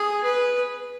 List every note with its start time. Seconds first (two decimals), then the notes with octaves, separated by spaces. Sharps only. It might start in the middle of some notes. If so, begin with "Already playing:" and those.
Already playing: G#4
0.24 B4